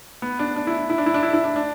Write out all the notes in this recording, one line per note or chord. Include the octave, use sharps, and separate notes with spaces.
B3
D4
D4
E4
E4
D4
E4
D4
E4
E4
D4
D4